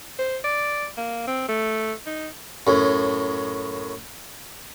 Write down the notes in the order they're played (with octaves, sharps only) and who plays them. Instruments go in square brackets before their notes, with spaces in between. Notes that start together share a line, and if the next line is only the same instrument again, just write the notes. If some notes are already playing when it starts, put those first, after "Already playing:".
[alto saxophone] C5
D5
A#3
C4
A3
D#4
[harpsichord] F#2 A2